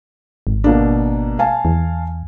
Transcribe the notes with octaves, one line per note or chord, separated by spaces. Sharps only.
G#1
B2 A#3 D4
F5 G#5 A5
E2